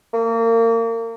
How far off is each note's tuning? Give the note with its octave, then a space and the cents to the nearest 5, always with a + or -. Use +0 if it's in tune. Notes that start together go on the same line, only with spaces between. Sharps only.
A#3 -30